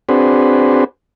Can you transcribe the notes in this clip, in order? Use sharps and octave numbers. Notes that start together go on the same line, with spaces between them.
C4 D4 F#4 G#4 B4 C5